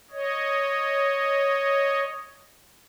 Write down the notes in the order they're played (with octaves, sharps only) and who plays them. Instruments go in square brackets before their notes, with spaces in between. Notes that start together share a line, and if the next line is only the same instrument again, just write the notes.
[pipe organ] C#5 D#5